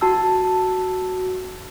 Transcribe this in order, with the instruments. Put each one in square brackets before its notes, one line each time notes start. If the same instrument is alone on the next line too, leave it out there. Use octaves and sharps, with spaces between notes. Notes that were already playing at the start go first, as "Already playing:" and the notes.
[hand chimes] F#4 A5 E6